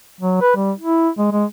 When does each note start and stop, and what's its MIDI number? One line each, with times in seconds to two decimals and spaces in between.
0.21 0.38 54
0.41 0.52 71
0.56 0.72 55
0.79 1.09 64
1.18 1.28 56
1.32 1.45 56